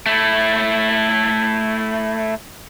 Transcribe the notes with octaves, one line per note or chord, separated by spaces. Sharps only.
A3 E4